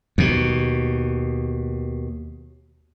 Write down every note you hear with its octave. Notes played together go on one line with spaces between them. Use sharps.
D#2 B2